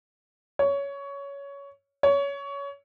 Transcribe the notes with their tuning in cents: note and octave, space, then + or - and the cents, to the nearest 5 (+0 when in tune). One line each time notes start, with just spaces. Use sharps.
C#5 +15
C#5 +20